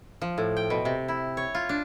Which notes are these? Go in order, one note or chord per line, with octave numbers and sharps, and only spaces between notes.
F3
A2
G5
B2
C3
E4
C#5
F4
D4